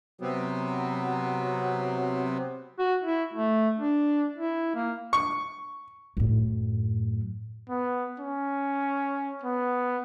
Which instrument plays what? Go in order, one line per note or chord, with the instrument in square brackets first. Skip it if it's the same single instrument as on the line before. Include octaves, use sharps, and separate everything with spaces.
[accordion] C3 B3 C4 [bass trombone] F#3
[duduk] F#4
E4
A3
D4
E4
A#3
[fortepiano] C#6
[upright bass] F#2 A2
[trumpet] B3
C#4
B3